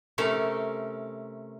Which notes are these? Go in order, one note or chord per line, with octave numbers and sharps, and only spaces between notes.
C3 A3 C#4 A4 A#4